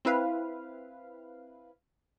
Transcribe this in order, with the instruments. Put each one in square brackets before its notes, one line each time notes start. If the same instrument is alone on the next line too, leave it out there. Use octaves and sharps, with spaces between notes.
[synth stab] C4 E4 B4 F5